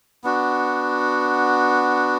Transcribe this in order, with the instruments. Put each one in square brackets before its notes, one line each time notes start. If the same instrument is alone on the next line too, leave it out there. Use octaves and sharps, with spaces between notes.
[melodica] B3 D4 F#4